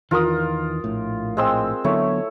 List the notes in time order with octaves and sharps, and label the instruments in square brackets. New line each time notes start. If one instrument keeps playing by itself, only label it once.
[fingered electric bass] E2 D#3 E3 [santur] F4 A#4 D#6
[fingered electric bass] A#1 A2
[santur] G#3 C4 E6
[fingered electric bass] D3 F#3 B3 [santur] A3 E4 C#5